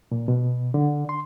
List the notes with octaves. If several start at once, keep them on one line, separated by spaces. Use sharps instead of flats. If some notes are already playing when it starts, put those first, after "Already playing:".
A#2
B2
D3
C6